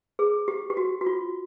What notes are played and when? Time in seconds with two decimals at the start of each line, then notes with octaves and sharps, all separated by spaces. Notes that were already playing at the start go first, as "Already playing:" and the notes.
0.19 G#4
0.48 G4
0.70 G4
0.77 F#4
1.01 F#4
1.06 F4